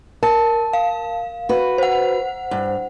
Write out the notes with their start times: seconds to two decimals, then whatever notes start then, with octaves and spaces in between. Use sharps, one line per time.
0.23 A#4 A5
0.73 F5
1.49 F#4 B4
1.78 C5 F#5
2.51 G2